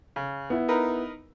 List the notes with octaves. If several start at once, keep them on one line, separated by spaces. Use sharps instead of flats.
C#3
B3 E4
D#4 A#4 B4